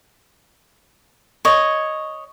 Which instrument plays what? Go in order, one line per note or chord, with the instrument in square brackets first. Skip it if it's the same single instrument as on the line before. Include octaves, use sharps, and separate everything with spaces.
[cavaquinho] C#5 D#5